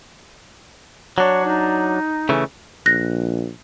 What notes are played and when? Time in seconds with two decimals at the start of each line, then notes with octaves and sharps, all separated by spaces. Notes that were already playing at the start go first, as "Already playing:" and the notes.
1.18 F#3 D4 C#5
1.44 D#4
2.29 C#3 E3 A3
2.86 A#1 F#6 A#6